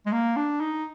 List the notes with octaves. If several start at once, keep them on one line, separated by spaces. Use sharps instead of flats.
G#3
A#3
D4
D#4